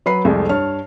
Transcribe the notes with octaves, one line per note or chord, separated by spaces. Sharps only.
F#3 B4 B5 C7
C2 F2 G#3 A3
G2 C#5 A5 F6